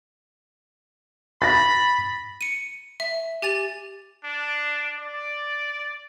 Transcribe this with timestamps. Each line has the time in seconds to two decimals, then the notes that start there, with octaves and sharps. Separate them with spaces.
1.42 B5 A6 A#6
2.41 C#7 D#7
3.00 E5
3.42 G4 G#5 A6 F7
4.24 D4
4.99 D5